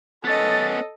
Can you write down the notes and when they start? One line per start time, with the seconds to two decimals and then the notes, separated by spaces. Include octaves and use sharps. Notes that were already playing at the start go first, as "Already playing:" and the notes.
0.25 B3 C#4 A4 D#5 A6